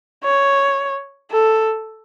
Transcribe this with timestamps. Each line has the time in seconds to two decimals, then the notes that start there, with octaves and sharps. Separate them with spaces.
0.24 C#5
1.31 A4